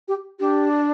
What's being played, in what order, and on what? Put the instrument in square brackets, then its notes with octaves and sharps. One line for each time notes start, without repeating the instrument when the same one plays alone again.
[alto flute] G4
[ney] D4 [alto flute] G4